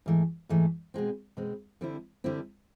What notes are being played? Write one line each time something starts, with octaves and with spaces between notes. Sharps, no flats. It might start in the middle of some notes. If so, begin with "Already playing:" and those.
G#2 E3 A3
G#2 E3 A3
B2 G#3 C4
B2 G#3 C4
D3 G3 C4 E4
D3 G3 C4 E4